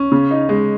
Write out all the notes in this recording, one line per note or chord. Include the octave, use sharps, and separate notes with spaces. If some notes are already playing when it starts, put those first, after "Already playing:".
Already playing: C#4
C#3
D#4
G#3